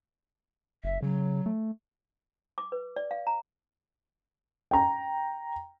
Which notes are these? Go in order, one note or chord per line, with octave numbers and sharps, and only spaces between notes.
F#1 E5
C#3 F#3
A3
D6
B4
D5
F5
A#5
G5 A#5